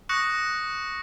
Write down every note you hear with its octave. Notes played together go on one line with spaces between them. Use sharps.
C#6 D#6 F#6 A#6 C#7